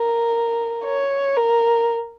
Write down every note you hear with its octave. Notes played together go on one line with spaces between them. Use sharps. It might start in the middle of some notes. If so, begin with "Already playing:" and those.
Already playing: A#4
C#5
A#4